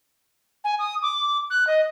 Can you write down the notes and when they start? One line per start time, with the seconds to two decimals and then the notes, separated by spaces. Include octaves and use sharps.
0.64 G#5
0.79 D#6
1.02 D6
1.50 F#6
1.67 D#5